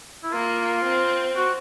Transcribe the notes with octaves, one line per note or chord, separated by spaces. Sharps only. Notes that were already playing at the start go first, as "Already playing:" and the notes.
E4
A#3 F4
C4
F#4